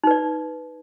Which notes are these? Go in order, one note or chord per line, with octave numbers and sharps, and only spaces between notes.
D#4 B4 D5